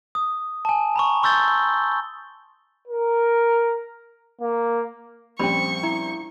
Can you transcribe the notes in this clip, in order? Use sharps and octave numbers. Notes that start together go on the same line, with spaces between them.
D#6
G#5 A5
A#5 B5 C#6
C6 C#6 E6 G6 A6 G7
A#4
A#3
A#1 G3 C4 C#4 C5 B5 C#6
E4 A#5